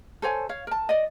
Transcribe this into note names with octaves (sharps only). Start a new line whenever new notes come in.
A4 C5 C#5 G#5
C#5 F5
A#4 A5
D5 D#5